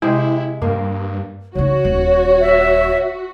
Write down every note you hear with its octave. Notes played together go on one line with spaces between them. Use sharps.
C3 G#3 E4 G5
G2 A#3
C#3 D#4 F#4 C#5
D#1
E5